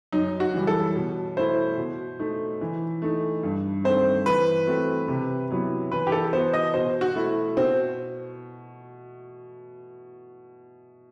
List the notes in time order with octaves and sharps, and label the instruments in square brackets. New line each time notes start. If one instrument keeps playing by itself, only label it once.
[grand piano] F#2 [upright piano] D#4
[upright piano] F#4
[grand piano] E3 G3
[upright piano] A4
[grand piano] B2
[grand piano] A3 E4 [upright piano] C5
[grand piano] B2
A3 D#4
E3
A3 D#4
G2
[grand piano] D#3 A3 C4 [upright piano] C5
[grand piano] E3 [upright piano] B4
[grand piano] A3 C4 F#4
C3
F#3 B3 E4
[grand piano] E3 [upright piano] B4
[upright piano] G4
A4
[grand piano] B3 F#4 [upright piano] C5
[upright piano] D#5
[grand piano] B2 [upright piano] C5
[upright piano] F#4
[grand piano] A3 E4
[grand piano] B2 [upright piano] C4